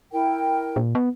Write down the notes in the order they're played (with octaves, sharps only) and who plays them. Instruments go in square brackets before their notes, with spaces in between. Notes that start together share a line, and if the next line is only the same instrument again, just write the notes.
[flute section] E4 A#4 G5
[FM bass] A#2
B3